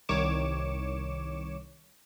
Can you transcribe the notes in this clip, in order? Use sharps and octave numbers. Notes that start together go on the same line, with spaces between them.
C2 D#3 C#5 D6 C#7 E7